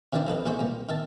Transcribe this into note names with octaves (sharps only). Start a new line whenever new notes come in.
C3 D#3 E3 C4 D4 E4
F3 A4 B4 D#5
A#1 E3 G#4 C5 B5 C#6
C2 A#2
D#3 E5 A5